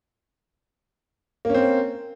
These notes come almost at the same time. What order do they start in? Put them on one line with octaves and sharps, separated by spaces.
A#3 C#4 C4